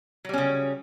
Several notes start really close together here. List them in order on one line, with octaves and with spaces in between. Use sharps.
F#3 G3 C#4 C#3